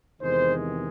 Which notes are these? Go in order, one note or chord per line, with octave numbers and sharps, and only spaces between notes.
E2 C3 D#3 G#3 C5